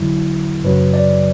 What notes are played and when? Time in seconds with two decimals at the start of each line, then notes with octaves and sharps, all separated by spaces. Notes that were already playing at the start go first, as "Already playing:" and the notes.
Already playing: E2 D3 F#3 E4
0.64 F#2 C#3 F#3 B4
0.94 D5